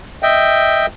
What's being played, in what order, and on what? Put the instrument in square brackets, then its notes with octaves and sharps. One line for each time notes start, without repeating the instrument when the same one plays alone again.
[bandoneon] D#5 E5 G5